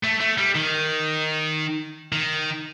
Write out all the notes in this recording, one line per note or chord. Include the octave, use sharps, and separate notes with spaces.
A3
A3
G3
D#3
D#3